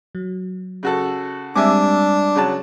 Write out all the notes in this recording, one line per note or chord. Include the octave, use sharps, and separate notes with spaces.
F#3
C#3 F#4 A4
G3 G#3 C4 D4 E5 G#5 D6
C#3 F#3 A5